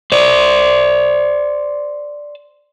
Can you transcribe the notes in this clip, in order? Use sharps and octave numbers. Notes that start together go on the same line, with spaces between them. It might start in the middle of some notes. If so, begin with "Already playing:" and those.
C5 D5